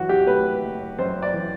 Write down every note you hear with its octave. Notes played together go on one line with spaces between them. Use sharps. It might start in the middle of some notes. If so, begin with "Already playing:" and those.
Already playing: F#2 E3 F#4
G4
A3 B4
F#1
F#2 C5
D5
E3